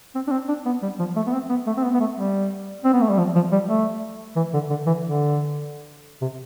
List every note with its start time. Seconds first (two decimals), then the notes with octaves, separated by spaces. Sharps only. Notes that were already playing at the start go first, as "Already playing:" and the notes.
0.15 C4
0.27 D4
0.32 C4
0.48 D4
0.66 B3
0.82 G3
0.99 F3
1.16 A3
1.27 B3
1.33 C4
1.49 B3
1.67 A3
1.77 C4
1.83 B3
1.94 B3
2.00 A3
2.17 G3
2.84 C4
2.93 B3
3.01 A3
3.10 G3
3.18 F3
3.35 F3
3.52 G3
3.68 A3
4.36 E3
4.54 D3
4.70 D3
4.87 E3
5.04 D3
6.21 C3